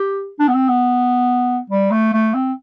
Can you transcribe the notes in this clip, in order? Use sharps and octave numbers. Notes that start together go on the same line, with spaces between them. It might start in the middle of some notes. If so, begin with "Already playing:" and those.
Already playing: G4
D4
B3
C4
B3
G3
A3
A3
C4